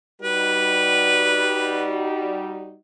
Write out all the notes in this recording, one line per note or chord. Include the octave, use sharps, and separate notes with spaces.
G3 D#4 F#4 B4